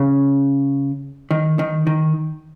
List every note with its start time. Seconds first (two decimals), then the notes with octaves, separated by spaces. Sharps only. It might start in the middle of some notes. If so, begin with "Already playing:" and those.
Already playing: C#3
1.31 D#3
1.59 D#3
1.87 D#3